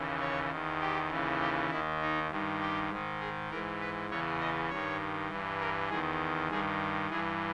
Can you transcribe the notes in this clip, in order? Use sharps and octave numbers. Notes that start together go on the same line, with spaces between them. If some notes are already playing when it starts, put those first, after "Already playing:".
Already playing: D#2 C#3 E3
C#5
E2 D#3
G4
D#2 C#3 E3
G4
D#2 D#3 E4
D#4
G2 D#3
G4
G#2 D#3
G#4
G#2 E3 A#4
B4
E2 C#3 E3 C#5
D#5
G2 D#3 C#5
G2 E3
A#4
E2 D#3 G#4
G2 D#3 G#4
G2 E3 G#4